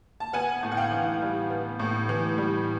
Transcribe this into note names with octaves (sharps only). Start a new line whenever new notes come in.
A5
B3 F#5 G#5
A2
F#5
F5 G5
E3
G3
B3
A2
E3
G3